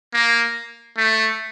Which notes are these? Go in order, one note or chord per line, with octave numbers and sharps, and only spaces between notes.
A#3
A3